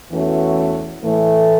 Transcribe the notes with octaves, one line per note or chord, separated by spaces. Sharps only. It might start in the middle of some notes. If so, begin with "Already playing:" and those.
E2 E3 A3 C#4 F#4
A2 E3 A3